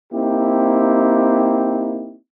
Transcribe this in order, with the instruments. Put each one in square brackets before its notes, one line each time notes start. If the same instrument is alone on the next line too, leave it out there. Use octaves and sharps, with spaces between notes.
[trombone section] A#3 C4 D#4 E4 G4